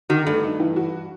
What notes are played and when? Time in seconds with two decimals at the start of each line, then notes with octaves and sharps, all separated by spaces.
0.09 D#3 F#4
0.26 G2 A3
0.43 D#4
0.60 E3
0.76 F#4